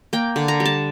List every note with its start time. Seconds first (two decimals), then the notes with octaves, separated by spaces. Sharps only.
0.13 A#3 G5
0.36 D3
0.48 A#5
0.60 G3
0.65 A5